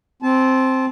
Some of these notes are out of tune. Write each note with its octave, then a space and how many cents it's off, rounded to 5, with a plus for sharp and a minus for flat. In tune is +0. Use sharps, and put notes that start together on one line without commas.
C4 +0 A5 -25